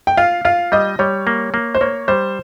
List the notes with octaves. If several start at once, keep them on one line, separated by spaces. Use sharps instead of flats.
G5
F4 F5
F4 F5
G3 D#5
G3 C#5
A#3
A#3
C5
A#3 C#5
G3 C5